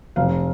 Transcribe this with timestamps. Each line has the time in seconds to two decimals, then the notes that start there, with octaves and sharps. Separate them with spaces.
0.16 F1 F5